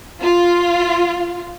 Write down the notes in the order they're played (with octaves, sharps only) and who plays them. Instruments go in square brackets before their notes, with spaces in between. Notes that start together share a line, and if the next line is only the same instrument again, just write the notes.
[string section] F4